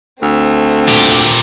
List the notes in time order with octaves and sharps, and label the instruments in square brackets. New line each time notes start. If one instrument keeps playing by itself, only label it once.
[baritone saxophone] D2 [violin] A3 C4
[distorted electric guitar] A#2 G4